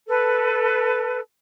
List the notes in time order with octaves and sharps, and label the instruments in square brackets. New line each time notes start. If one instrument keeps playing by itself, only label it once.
[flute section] A4 B4